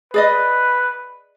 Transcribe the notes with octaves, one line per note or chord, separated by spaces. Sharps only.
G#4 B4 D5 D#5